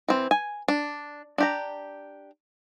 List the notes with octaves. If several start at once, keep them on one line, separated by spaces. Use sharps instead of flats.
E3 C4
G#5
D4
D4 G4 A#5